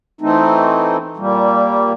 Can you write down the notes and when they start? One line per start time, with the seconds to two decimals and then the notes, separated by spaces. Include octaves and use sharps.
0.21 E3 A3 C4 D#4
1.17 A#2 G3 A#3